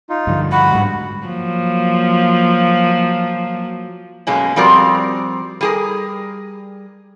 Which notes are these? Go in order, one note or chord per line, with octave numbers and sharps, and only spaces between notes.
D#4 F4
G2 D3 F3
F#4 F#5 B5
G#2 G3
F3 F#3 A#3
F#2 B2 G#3 A#3 C#4
F3 G3 C4 F#4 A#4 D5
G3 G#4 A#4